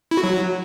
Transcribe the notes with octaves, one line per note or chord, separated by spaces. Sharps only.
E4
F#4
F#3